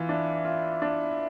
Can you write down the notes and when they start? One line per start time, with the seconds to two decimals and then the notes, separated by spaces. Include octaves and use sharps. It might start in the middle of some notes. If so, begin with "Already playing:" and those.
Already playing: E3 F4
0.09 D4 E5
0.45 F4
0.82 D4